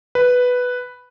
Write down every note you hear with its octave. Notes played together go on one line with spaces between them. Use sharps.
B4